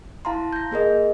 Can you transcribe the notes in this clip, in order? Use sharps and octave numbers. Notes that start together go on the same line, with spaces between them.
E4 F5 A5 A#5 C6
G6 A#6
A#3 G#4 A#4 D#5